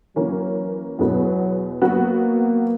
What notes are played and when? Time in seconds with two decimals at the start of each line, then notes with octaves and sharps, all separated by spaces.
0.16 E3 F#3 A#3 C#4
0.99 E2 B2 F#3 G#3 B3
1.82 F#3 A#3 B3 F#4